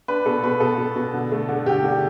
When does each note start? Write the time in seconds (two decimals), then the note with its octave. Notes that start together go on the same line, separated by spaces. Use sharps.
0.08 D4 B4
0.26 B2 A4
0.43 B2 B4
0.60 B2 A4
0.78 B2
0.96 B2
1.14 D3
1.32 A3
1.49 D3
1.66 D3 G4
1.84 D3